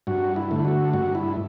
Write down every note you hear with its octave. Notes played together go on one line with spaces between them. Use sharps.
G2 F#4
E4
D3 A3
E4
F#4
G2 F#4
E4